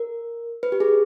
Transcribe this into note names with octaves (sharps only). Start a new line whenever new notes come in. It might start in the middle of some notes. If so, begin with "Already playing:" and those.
Already playing: A#4
B4
G4
G#4